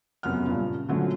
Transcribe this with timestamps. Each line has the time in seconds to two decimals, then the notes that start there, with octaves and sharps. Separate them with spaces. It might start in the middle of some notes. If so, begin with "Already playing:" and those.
0.23 F1 F#2 F#3 B3 F#5 F6
0.45 G2 A#2 C#3
0.88 A#2 D3 F3 F#3 A3 C#4